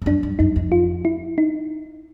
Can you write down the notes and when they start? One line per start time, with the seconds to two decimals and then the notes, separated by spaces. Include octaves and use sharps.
0.02 F2
0.06 F#2 D4
0.23 G2
0.39 F#2 D#4
0.56 F2
0.72 F4
1.05 E4
1.38 D#4